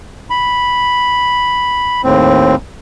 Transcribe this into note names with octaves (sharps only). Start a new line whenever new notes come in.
B5
D#2 A2 C4